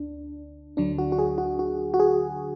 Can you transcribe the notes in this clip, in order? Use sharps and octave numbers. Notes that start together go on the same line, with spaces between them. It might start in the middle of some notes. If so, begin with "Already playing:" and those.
Already playing: D2 D4
D2 D3 F#3 D4
F#4
F#4
G#4
F#4
F#4
F#4
G#4